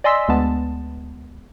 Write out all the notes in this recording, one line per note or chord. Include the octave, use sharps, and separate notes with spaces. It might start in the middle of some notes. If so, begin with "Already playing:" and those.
D5 D#5 G#5 C6 E6 B6
D2 G#3 B3 A5